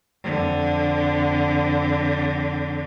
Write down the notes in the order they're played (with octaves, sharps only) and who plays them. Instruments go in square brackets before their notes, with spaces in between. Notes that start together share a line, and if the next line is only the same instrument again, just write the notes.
[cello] F2 D3